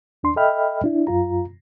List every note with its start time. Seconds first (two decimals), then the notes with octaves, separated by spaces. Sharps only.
0.23 D#2 D4 C6
0.36 A4 D#5 E5 G5 B5 F6
0.84 D4 E4
1.07 F#2 F4 A#5